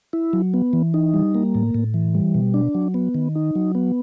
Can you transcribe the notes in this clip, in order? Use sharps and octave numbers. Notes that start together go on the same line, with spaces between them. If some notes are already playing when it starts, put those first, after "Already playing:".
E4
F#3
B3
E3
D#4
G3
A#3
A2
A2
E3
G3
B2
D4
F#3
B3
D#3
D#4
F#3
B3